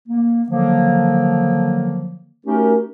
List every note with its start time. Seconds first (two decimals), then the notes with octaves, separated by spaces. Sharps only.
0.08 A#3
0.50 D3 D#3 F3 F#3 A#3
2.46 A3 C#4 D#4 F#4 G4 A#4